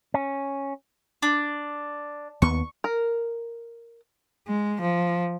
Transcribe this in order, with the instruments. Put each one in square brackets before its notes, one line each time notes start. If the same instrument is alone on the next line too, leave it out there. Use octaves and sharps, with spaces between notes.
[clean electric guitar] C#4
[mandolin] D4
[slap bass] D#2 B3 [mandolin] C#6
[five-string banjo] A#4
[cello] G#3
F3